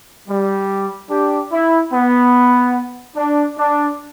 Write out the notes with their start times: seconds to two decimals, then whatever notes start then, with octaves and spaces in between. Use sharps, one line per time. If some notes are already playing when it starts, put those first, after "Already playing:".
0.29 G3
1.10 D4 G4
1.52 E4
1.93 B3
3.16 D4
3.58 D4